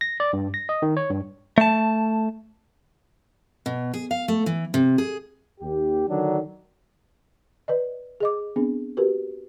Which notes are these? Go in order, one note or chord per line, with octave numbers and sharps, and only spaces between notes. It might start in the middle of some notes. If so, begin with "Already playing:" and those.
A#6
D5
G2
A#6
D#5
D#3
C#5
G2
A3 A5
B2
G#4
F5
A3
E3
C3
G#4
D#2 G4
D3 D#3 F#3 D4
B4 D5 D#5
G#4 D#5 D6
B3 C4 D4 G#4
F#4 G4 A#4 B4